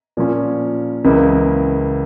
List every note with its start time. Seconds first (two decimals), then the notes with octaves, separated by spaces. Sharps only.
0.17 A#2 F3 C#4
1.04 C#2 C#3 E3 A#3